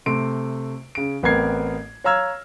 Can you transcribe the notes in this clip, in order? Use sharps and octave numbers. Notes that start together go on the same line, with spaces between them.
C3 A3 C6 D7
C#3 D7
A1 B3 C4 A#4 G#6 C7
C#5 F5 A#5 E6 F6 G#6